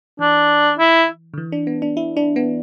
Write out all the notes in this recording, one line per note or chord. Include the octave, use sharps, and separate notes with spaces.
E3 D4
E4
D3
E3
D4
B3
D4
E4
D4
B3